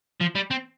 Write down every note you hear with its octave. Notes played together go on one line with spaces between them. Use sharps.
F3
G3
C4